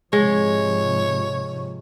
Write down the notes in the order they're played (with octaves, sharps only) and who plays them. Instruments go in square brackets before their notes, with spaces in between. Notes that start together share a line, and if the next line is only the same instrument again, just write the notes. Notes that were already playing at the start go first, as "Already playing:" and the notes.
[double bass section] G#2 C3 F3 [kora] G#3 [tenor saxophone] C#5